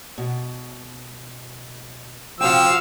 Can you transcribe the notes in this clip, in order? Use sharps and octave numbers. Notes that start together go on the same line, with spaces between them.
B2
C3 F3 F#4 F5 G5 E6